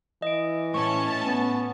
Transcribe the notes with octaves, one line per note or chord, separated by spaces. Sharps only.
E3 D#5 D7
A2 C#4 A5 C#6
B3